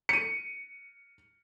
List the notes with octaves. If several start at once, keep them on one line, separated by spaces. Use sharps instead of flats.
C#7 D#7